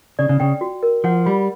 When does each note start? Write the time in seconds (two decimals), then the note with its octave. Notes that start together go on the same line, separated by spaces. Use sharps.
0.19 C#3 D5
0.29 C#3
0.40 C#3 G5
0.61 F#4
0.83 A#4
1.04 F3 F#5
1.26 G3 B5